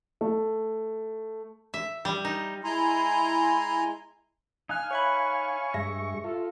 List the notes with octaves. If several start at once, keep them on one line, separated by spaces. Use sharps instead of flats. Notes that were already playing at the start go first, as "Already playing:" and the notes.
A3
E5
G3
D#4
G#3 E4 G#5 A#5 C6
D#4 F5 G#5 F6 F#6
C#5 E5 B5 C#6
G2 G#3 E5 A#6
F4 A4